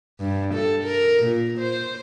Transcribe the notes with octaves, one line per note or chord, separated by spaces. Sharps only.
G2
A4
A#4
A#2
C5